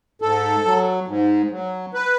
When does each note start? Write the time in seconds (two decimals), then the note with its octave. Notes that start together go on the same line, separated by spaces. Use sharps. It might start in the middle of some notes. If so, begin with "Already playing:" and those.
0.22 G#2 A4
0.65 F#3
1.08 G#2
1.51 F#3
1.94 B4